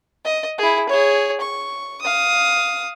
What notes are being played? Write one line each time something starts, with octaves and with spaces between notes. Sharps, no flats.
D#5
E4 G#4
G#4 C#5
C#6
F5 D#6